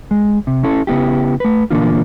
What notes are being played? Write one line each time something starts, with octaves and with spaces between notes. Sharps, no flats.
G#3
C3
C#4 E4 A4
C#3 B3 E4 G4
A3 B4
A#2 D3 E3 A#3 D4 F4